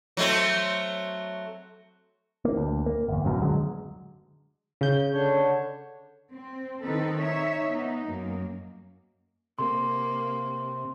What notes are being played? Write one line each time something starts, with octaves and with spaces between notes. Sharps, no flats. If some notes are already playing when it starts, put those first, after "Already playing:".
F#3 A3 C4
A#3
D2
A#3
G1 E2
D1 A1 F#2 B2
D3 F#3 G#3
C#3 G6
D3 D4 C#5
C4
D#3 C4 D#4 A4 B4
D#4 C#5 E5
B3 D#4
F#2 A#3
C3 A#3 C6